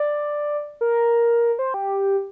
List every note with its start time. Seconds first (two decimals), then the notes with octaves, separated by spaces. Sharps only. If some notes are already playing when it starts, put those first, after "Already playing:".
Already playing: D5
0.81 A#4
1.59 C5
1.74 G4